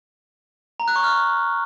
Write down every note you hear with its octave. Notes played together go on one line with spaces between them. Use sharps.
A#5
F#6
C#6
F6